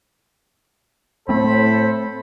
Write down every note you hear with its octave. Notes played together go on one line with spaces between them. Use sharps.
A2 A3 C4 A4 C5 B5